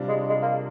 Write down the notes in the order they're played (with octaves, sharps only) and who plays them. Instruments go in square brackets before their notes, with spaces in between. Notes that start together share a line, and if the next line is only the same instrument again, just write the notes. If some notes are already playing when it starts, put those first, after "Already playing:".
Already playing: [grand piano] C3 G3 D4 F4
[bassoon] G#3
G#3
A#3